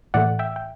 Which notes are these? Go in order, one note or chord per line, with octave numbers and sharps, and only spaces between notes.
A2 E3 A3 D5 F#5
E5 G5
G5